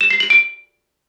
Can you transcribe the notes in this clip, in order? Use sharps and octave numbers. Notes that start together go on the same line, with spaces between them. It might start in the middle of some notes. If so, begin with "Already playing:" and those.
E7
C7
F#7
D7